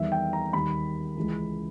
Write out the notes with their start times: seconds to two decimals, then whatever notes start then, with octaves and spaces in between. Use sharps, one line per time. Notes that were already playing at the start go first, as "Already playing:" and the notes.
Already playing: E2 D#3 G3 E5
0.12 G5
0.33 A#5
0.53 D#2 D#3 G3 B5
1.16 C#2 C#3 E3